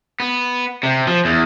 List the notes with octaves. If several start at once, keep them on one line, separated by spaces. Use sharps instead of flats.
B3
C3
F3
E2